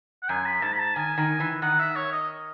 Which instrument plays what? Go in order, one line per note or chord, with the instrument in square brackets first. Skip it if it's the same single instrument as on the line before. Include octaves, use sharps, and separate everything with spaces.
[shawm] F#5
[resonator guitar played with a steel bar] F#2 [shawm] G#5
[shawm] B5
[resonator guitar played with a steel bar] G#2 [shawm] A5
[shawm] B5
A5
[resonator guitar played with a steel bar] D#3 [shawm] G#5
[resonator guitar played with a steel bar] D#3
E3
[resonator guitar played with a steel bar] D#3 [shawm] F#5
[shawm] E5
C#5
D#5